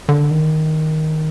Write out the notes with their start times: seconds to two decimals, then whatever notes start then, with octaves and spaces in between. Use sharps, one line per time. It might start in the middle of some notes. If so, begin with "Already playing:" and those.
0.09 D3
0.31 D#3